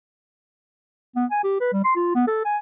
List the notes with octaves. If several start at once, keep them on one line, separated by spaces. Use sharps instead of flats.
B3
G#5
G4
B4
G3
C6
F4
B3
A4
G#5